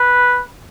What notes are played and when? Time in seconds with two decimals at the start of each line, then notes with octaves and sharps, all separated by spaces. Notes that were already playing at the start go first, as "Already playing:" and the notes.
Already playing: B4